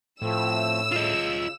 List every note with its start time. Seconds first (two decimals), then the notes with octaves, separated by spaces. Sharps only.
0.22 A2 F3 A3 C4 E6
0.92 C#3 F4 D#5